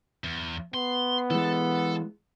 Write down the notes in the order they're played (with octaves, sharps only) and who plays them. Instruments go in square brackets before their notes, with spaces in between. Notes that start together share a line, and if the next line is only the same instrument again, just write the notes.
[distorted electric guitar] E2
[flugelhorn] B3 [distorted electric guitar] C6
[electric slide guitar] E3 G#3 [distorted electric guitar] A4